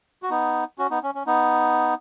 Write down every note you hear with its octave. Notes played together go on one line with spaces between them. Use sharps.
F#4
B3 D#4
C#4 F#4
B3 D#4
C#4
C#4
B3 D#4